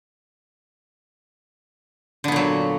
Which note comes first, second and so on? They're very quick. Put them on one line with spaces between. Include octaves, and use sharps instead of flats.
D3 B3 A#2 F#3